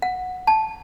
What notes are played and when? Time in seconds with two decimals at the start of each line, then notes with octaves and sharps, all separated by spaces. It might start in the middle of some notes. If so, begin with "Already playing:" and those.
0.02 F#5
0.47 A5